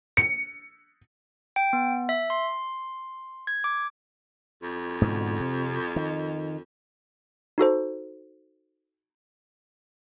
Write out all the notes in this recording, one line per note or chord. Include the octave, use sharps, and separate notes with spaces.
C#7
G5
B3
E5
C6
G#6
D6
F2
G#2 B2 D3
C3
D#3
D#4 F#4 A4 C5